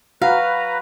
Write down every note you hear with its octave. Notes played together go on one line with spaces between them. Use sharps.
F#4 B4 F5 A#5